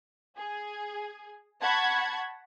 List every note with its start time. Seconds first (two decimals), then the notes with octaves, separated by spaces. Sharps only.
0.36 G#4
1.62 F#5 A5 B5 C#6 G#6